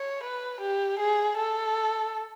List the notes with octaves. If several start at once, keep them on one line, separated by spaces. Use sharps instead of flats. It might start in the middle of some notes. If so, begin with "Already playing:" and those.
Already playing: C#5
B4
G4
G#4
A4